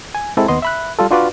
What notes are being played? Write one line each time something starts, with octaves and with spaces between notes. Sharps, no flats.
G#5
G#3 C4 E4 A4
D#2 B3 D#5 C6
E5 B5 F#6
G3 F4 A4
D4 F4 F#4 B4 D5